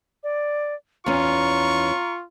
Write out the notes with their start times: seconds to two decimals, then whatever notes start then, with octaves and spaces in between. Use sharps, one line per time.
0.23 D5
1.06 E2 C#4 F4 A#5 C#6